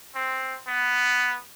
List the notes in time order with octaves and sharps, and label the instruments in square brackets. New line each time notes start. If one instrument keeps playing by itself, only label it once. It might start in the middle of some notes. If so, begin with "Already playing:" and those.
[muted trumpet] C4
B3